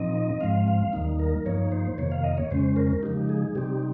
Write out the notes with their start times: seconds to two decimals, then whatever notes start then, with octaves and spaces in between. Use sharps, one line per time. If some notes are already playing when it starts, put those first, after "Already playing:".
Already playing: A#2 F3 C4 D#4 D#5
0.41 G#2 F3 G#3 C4 F5
0.68 F5
0.93 D#2 D#3 G3 A#3 D#4
1.19 A#4
1.46 G2 F3 A#3 D#4 C#5
1.72 C5
1.98 F2 C3 D#3 A#3 C#5
2.12 F5
2.24 D#5
2.38 C#5
2.51 F2 C#3 G#3 C#4 C5
2.76 A#4
3.02 C#3 F3 G#3 D#4 G4
3.29 G#4
3.55 C3 G3 C4 D#4 G4